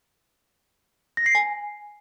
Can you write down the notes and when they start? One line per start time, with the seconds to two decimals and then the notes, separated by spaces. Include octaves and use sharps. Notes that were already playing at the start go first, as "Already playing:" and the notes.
1.17 A#6
1.26 C7
1.35 G#5